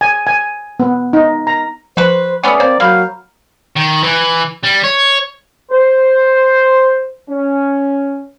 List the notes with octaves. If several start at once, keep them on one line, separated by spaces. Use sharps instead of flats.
G#5
G#5
B3
D#4
A#5
F3 F#4 B4 C5
A3 B3 C#4 D5 F#5 B5 D#6
A#3 C4 C5
F#3 A#3 F5 A#5 B5 G6
D#3
E3
G3
C#5
C5
C#4